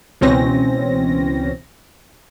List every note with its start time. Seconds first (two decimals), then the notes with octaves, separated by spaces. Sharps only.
0.21 C#2 B2 E3 C4 C#4 A#6